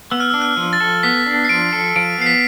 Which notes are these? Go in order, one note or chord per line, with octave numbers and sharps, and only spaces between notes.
B3 E6
F6
D4 E6
F6
F3
A6
A4
B3 B6
D4
C7
F3 D7
A4
F3 D7
B3 C7
B6